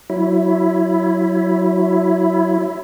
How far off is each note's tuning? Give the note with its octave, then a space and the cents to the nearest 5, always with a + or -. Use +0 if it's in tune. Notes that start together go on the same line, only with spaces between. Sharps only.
F#3 +0 E4 +5